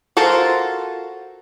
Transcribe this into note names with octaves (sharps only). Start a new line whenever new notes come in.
F4 F#4 A4 A#4 C5